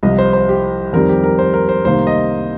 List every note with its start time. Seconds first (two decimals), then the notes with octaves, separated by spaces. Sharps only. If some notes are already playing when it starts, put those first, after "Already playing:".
0.03 C2 C3 F3 D#5
0.18 C5
0.33 C5
0.49 G4
0.93 F2 D#3 G3 C4 A#4
1.09 G4
1.24 A#4
1.39 C5
1.54 A#4
1.69 C5
1.84 C2 C3 D#3 A#3 C5
2.07 D#5